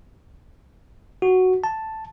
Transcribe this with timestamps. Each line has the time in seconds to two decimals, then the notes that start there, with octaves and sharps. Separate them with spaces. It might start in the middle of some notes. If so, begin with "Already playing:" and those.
1.22 F#4
1.64 A5